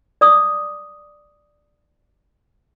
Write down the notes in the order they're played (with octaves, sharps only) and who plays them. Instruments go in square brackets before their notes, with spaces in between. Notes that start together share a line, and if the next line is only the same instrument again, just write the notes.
[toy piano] D5 D6 D#6